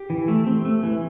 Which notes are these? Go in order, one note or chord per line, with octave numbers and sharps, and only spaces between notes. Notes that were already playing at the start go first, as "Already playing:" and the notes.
Already playing: G4
E3
A3
C4
A3
E3